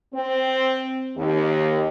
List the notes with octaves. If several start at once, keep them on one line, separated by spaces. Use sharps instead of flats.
C4
D#2